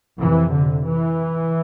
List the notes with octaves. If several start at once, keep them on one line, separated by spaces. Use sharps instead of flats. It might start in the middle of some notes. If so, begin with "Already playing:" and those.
F2 C3 E3
D3
E3